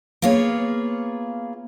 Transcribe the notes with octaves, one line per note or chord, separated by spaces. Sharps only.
A#3 B3 F4 G#4 C#5